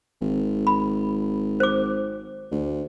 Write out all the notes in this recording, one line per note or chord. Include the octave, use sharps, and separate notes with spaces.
G#1
B5
C5 D6
D2